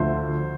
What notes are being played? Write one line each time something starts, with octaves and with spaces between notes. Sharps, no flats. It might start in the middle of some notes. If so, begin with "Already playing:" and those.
Already playing: D2 D3 F3 C5 E5